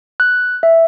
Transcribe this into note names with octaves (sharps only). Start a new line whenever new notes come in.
F#6
E5